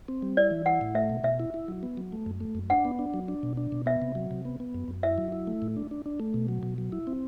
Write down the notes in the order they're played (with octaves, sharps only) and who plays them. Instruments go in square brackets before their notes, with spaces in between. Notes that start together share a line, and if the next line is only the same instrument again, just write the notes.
[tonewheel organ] C4
G3
[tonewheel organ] E4 [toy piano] D5
[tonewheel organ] E3
[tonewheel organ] E4 [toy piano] F#5
[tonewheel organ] A2
[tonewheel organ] A3 [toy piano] E5
[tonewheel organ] B2
[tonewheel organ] B2 [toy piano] E5
[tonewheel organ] E4
E4
F#3
B3
F#3
A3
F#2
A3
F#2
[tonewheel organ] D4 [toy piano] F#5
[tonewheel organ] B3
D4
F#3
D4
B2
D4
B2
[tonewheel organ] B3 [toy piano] E5
[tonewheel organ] C3
F#3
C3
B3
B3
F#2
F#2
[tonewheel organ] E4 [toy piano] E5
[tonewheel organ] F#3
E4
A3
A2
D4
D4
D4
A3
B2
F#3
B2
F#3
E4
C4